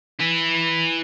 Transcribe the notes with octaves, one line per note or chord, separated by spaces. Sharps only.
E4 B4